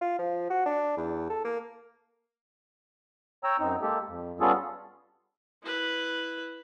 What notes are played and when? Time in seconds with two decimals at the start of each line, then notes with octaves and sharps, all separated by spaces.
0.01 F4
0.18 F3
0.50 F#4
0.66 D4
0.97 E2
1.30 A4
1.45 A#3
3.44 C#5 G5 A#5 E6
3.59 F#2 C4 D#4
3.82 G#3 A#3 G4 A4
4.08 F2
4.40 G3 B3 C#4 F4 G#4 A4
5.63 E4 B4